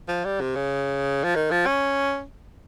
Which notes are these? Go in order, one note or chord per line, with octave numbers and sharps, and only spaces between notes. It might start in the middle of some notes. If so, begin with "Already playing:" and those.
F3
G3
C3
C#3
F3
D#3
F3
C#4